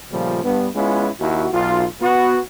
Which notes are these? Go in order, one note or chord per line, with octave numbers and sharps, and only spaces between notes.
A#2 C#3 F3 G3 A3
G2 B3
G#3 B3 C#4 E4 F4
D#2 E4 F#4
B1 F4
B3 F#4